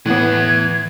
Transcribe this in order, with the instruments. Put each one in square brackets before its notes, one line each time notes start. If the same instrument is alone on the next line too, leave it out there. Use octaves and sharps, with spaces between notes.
[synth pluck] A2 B3 [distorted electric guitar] E3 F#5 [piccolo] G#6